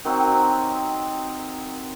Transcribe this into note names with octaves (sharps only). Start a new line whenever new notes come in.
D#3 F#3 C4